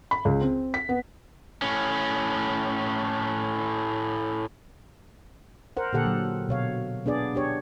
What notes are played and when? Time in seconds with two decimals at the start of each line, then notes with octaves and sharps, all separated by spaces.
0.11 B5
0.25 C#2
0.41 C4
0.74 B6
0.89 B3
1.62 A2 C#4
5.77 A#4 C5 F#5
5.93 A#2 D3 G4 A4 F#5
6.06 F#3
6.49 B2 C#5 F5
7.06 B3 D4 G#4 D5
7.35 D4 G4 C#5